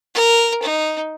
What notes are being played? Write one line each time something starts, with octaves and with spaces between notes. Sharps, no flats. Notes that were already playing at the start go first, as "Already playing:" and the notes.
A#4
D#4